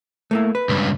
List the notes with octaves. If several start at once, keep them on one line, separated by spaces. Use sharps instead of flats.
A3 A#3 E4
B4
C#2 G2